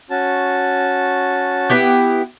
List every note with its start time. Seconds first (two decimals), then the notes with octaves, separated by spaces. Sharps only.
0.10 C#4 F#4 A5
1.70 B3 E4 G4